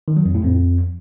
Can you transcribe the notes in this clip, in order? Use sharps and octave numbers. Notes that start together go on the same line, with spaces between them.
D#3
F#3
F2
A2
F2